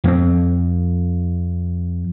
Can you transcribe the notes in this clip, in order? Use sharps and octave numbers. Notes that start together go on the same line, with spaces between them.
F2 A#3 C4